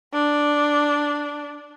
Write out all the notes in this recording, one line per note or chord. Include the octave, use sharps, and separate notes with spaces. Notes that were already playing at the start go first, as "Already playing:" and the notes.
D4